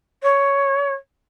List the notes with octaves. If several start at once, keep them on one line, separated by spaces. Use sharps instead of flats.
C#5